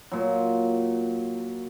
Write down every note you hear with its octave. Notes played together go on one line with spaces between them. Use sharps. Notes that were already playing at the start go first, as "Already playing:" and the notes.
A#2 F#3